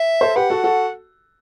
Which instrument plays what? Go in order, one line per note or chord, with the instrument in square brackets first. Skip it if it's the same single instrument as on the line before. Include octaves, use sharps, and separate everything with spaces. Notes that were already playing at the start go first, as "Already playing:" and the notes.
Already playing: [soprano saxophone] E5
[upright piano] A4 C5
[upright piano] G4 B4 [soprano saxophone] F#5
[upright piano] F#4 A4
F#4 A4